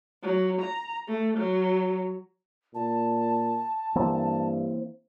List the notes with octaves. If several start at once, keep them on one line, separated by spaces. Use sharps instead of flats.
F#3
A#5
A3
F#3
A#2 A5
G2 E3 A#3 C4